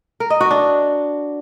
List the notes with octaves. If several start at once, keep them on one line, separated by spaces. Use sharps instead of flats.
A#4
D#5
F#4
D4